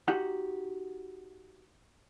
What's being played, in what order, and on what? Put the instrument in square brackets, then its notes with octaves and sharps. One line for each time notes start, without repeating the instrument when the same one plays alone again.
[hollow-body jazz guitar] D#4 F#4 G4 F#5